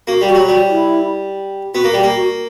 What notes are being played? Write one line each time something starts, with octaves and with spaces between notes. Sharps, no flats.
A#3 F#4
G3
F#4
F#3
G3 F#4
E4
B3 F#4
A#3
G3 G4
A#3
F#4